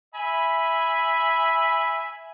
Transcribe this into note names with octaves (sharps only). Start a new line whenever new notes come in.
E5 G#5 B5